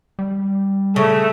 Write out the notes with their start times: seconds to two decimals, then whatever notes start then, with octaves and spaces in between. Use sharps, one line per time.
0.19 G3
0.96 C#3 A3